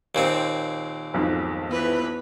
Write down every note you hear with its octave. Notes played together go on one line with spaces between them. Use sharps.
D#2 A#2 C4
B1 F2 G#2
E2 E3 B4